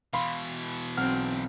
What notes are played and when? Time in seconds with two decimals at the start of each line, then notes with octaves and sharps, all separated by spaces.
0.13 B2 E3 F5 B5 C6
0.97 B1 C4 F#5 F6